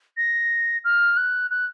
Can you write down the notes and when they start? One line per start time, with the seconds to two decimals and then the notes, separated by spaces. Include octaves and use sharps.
0.17 A#6
0.84 F6
1.17 F#6
1.50 F#6